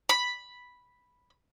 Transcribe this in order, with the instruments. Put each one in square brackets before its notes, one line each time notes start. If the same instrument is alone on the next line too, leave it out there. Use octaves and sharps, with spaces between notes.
[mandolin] B5